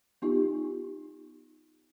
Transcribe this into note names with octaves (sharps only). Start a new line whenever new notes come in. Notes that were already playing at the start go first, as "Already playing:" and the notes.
B3 D#4 F4 G4